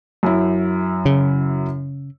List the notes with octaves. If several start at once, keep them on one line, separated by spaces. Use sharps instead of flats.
F#2 E4
C#3